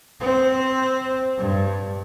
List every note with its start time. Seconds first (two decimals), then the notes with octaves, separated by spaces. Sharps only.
0.20 C4
1.38 G2